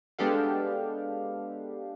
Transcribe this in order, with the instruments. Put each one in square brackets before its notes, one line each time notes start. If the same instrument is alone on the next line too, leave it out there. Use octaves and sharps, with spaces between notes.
[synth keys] G#3 B3 D4 G4 A4 F5